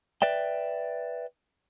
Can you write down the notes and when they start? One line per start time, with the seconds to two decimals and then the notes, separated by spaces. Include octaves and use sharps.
0.22 B4 D5 E5 G5